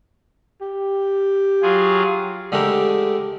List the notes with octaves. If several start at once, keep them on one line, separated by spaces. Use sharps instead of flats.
G4
F#3 F4 G#4
D3 G#3 A3 G4 A#4